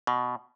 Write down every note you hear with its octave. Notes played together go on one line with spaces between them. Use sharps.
B2